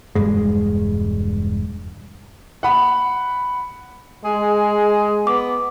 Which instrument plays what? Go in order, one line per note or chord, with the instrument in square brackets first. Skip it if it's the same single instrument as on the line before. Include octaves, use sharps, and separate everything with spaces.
[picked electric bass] E1 G2 G#3
[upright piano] F#5 B5
[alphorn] G#3 [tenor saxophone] G#4
[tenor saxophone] B3 [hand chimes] D6